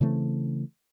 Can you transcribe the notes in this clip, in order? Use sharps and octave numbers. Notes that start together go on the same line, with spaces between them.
C#3 E3 A3 C4